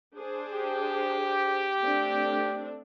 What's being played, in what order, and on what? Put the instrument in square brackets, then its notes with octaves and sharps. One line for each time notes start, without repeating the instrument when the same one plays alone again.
[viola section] D4 G#4 C5
[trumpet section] G4
[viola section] A3 C4 D4